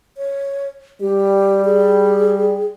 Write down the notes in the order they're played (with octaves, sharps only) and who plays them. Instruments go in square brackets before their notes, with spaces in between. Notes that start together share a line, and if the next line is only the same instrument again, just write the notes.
[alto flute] C#5
[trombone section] G3 [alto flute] G4
[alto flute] G#4